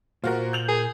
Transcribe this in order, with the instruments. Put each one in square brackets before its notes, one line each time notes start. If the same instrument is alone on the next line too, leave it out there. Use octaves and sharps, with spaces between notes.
[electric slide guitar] A#2 A#3 [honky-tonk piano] F4 F#4 A#4 [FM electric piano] C5
[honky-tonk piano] G6 F7 F#7
[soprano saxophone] G#4 [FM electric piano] A#4